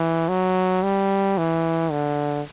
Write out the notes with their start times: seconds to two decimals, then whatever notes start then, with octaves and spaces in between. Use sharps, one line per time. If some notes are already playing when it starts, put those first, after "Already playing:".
Already playing: E3
0.28 F#3
0.83 G3
1.38 E3
1.91 D3